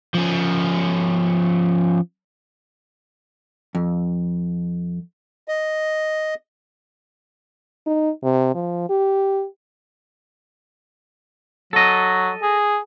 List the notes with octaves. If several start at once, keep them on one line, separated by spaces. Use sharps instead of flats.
F3 C#4
F2
D#5
D#4
C3
F3
G4
F#3 A4 D#5
G#4